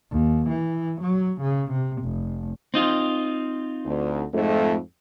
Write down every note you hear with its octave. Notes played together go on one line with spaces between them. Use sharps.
D#2
E3
F#3
C#3
C3
F1
C4 D#4 F4
D2
F2 G#2 A3